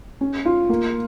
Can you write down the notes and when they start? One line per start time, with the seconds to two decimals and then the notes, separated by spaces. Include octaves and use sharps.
0.21 C#4
0.45 F4
0.69 A#3